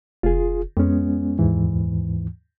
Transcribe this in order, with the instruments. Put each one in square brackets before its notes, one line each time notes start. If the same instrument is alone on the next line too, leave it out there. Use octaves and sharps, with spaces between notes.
[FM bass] F1 [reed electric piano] F4 G#4
[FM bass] F2 [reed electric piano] G#3 B3 C#4
[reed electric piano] D#2 G#2 E3